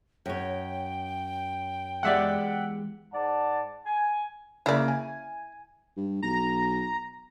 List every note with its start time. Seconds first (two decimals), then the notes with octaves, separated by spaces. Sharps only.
0.26 F#2 C#5 G5
2.03 E2 G#3 G4 D5 E5 F#5
3.13 G#2 D5 F#5 A5
3.86 G#5
4.66 C#3 A#3 E4 D5
4.88 G#5
5.97 G2
6.22 B1 A#5